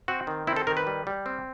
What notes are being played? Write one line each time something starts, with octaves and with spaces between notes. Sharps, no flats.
C4 F#4
D#3
C4 E4
A4
D#3 A#4
B4
G3
G3
C4